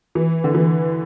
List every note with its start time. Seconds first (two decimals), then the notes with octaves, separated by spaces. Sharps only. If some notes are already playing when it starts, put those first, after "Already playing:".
0.15 E3
0.44 D3
0.54 E3